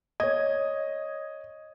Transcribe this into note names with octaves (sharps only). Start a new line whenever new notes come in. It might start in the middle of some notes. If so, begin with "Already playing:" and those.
C#5 D#5 G#6